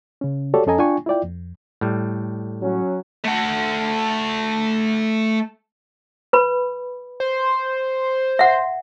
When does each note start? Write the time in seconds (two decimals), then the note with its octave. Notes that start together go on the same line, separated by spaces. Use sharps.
0.21 C#3 C#4
0.54 F#4 G4 A4 C#5 D5
0.66 F2 C#4 A4 D#5 G#5 A#5
0.79 D4 F4 G5 G#5 C#6
1.06 E4 F4 D5 G5
1.24 F2
1.81 A2 G3
2.61 F#3 C#4
3.25 A3 F#5
6.33 B4 B5
7.20 C5
8.39 E5 F#5